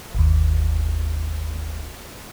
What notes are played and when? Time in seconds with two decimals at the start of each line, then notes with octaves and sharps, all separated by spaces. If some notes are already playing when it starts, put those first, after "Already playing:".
0.15 G1 D#2